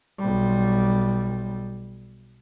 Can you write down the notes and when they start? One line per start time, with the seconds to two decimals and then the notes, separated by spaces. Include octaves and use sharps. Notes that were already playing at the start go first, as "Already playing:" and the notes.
0.19 B1 G3